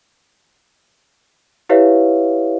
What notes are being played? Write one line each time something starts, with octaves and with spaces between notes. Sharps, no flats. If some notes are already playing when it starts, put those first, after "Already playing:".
E4 G4 B4 C#5 E5 F5